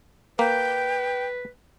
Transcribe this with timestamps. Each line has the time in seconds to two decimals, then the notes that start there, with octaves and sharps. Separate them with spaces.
0.39 A#3 B4 G5